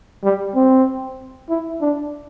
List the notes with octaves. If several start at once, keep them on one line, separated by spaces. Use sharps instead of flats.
G3
C4
E4
D4